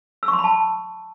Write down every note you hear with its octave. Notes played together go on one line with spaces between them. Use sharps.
E6
C#6
C6
B5
A5